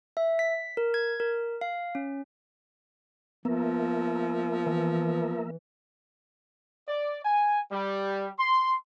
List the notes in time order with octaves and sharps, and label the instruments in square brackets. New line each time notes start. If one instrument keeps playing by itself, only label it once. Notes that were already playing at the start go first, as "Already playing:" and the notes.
[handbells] E5
B6
A#4
G#6
A#4
F5
C#4
[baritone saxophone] F3 [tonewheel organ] A#3 A#4 E5 [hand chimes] B3
[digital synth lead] E3
[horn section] D5
G#5
G3
C6